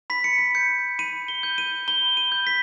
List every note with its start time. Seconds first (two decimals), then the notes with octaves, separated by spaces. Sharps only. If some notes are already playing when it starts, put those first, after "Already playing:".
0.10 B5 B6
0.24 C#7
0.38 B6
0.55 G6 C#7
0.99 B5 D#7
1.28 G7
1.43 G6
1.58 D#7
1.88 B5 G7
2.17 D#7
2.32 G6
2.47 B6